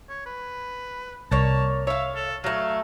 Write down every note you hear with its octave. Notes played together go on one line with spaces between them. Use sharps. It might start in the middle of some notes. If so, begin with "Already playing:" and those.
C#5
B4
C2 A#3 C#5 A5
C#5 E5 F5
A4
F#3 A3 F5